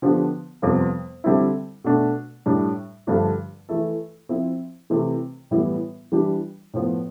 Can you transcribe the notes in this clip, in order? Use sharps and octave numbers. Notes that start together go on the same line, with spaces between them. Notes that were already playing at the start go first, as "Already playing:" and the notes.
D3 F3 B3 D4 G4
F2 C3 G3 B3 F4
D3 G3 C4 E4 A4
B2 A3 D4
A2 G3 D4
G2 D3 F3 A3 D4
E3 A3 E4 A4
F3 C4 E4
C3 E3 A3 C4
A2 E3 G3 B3 E4
E3 G3 D4 G4
A2 F3 B3